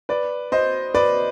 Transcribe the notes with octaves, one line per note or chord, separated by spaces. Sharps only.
B4 D5
C5 D#5
B4 D5